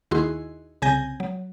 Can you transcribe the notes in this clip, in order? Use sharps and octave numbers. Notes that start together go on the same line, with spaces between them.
D#2 D#3 E4 F#4 G#4 C6
C2 C#3 G#5 G6 A#6
F#3